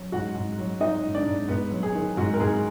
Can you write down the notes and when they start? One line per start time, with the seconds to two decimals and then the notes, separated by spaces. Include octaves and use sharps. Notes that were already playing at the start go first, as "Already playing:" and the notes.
Already playing: F#3
0.12 G#2 F#4 F#5
0.35 G#2
0.59 F#3
0.81 F#3 D#4 D#5
1.03 G#2
1.15 D4 D5
1.26 G#2
1.48 G#2 B3 B4
1.72 F#3
1.83 G#4
1.95 D#3
2.17 G#2 F#4
2.34 A#4
2.40 G#2 G#4